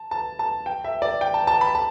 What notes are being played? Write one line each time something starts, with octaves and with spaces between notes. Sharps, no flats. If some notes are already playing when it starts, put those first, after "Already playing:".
Already playing: A5
A5
A5
G5
E5
D5
G5
A5
A5
B5
A5